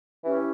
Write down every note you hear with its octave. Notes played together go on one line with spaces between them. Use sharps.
E3 C#4 E4 G4